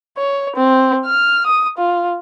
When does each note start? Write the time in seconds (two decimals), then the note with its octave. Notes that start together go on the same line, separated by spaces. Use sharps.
0.17 C#5
0.56 C4
1.05 F6
1.46 D#6
1.78 F4